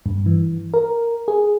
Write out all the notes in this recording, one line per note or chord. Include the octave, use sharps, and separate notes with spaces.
G2
E3
A#4
G#4